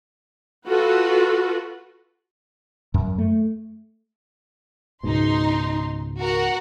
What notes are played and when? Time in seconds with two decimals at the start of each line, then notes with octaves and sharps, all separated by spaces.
0.66 F4 F#4 A4 B4
2.94 F#2
3.18 A3
5.03 C#2 G#2 B2 D#4 C6
6.19 F#4 A#4 F#5